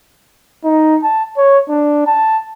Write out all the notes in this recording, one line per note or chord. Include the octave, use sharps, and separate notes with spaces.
D#4
A5
C#5
D4
A5